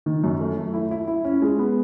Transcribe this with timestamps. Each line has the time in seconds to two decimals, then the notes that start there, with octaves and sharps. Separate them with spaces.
0.06 D#3
0.24 F#2
0.40 A3
0.57 A3
0.74 E4
0.91 E4
1.08 E4
1.25 C#4
1.42 G#3
1.59 B3